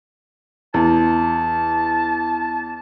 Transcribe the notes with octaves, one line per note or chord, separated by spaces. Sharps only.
E2 A5